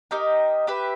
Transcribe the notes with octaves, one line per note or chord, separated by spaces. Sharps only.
D#4 G4 A#4 D#5
G4 B4 E5